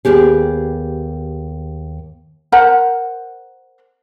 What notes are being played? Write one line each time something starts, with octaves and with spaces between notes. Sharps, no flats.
D#2 B3 G4 G#4
A#4 C5 F#5 A#5